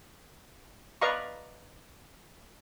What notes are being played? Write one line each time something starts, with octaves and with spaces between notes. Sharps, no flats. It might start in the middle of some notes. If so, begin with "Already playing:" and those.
B4 D5 D#5 F5 A#5 C#6